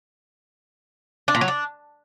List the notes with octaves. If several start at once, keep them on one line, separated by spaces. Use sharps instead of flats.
D4
A#2
F#3
D4